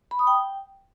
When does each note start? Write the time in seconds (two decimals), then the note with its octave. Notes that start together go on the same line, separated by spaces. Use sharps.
0.11 B5
0.19 D#6
0.27 G5